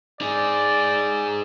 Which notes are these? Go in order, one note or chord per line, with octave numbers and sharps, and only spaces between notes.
D#4 G#4 D5